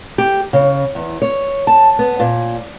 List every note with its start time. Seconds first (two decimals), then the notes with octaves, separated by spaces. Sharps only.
0.18 G4
0.53 C#3
0.95 E2
1.22 C#5
1.67 A5
1.99 B3
2.20 A#2